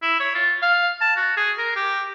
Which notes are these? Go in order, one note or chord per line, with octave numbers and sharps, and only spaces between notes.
E4
C#5
F4
F5
A5
F#4
G#4
A#4
G4